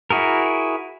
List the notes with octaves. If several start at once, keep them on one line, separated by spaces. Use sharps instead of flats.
E4 F#4 G#4 A#4